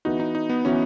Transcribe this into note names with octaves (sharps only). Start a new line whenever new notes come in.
E3 B3 D#4 F#4
D#4
D#4
B3
E3 B3 C#4 F#4